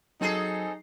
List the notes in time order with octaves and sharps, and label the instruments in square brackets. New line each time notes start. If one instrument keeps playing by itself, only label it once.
[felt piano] F#3 C7 [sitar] C4 G#4 A4 [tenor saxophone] D#4